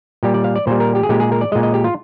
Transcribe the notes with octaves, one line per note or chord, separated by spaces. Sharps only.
A#2 G3 G4
D5
F5
D5
A#2 G3 C5
A#4
G4
G#4
A#2 G#3 G4
G#4
A#4
D5
A#2 G#3 D#5
D#5
G4
F4